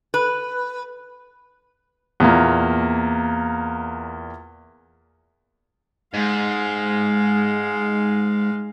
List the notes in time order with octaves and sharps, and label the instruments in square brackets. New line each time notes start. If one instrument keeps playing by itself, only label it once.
[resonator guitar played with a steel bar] B4
[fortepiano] E2 A#2 A#3
[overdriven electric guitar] G#2 [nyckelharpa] G#3 F5